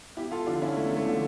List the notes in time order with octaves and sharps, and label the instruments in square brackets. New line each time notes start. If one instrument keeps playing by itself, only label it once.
[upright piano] E2 E4 G4
F4 A4
D3 F3 D4 F4
C#4 E4
E2 A3
A3
D3 F3